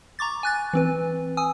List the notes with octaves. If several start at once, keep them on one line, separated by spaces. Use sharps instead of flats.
A#5 C#6 D6 A6
G#5 F#6 A6
E3 C4 B4
G#5 D#6 E6